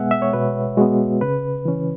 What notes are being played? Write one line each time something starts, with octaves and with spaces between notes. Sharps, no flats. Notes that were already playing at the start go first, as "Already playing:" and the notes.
Already playing: B2 G#3 B3 E5 F#5 G#5
E5
C#5
B2 B4
G#3 B3 F#4
C#3 B4
E3 C#4